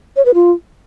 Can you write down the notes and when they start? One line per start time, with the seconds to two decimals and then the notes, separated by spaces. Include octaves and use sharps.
0.16 C#5
0.25 B4
0.34 F4